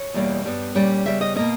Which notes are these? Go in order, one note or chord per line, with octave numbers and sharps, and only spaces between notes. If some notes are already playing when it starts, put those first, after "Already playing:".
Already playing: C#5
E2 B2 G3 A#3
G2 G3 B3
A#2 G3 C#4
C#3 G3 B3 E5
D#5
B2 A#3 C#4 D#5